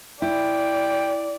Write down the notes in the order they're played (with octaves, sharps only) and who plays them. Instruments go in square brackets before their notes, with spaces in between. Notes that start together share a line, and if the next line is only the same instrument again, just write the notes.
[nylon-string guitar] E4 [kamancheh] D5 [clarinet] G5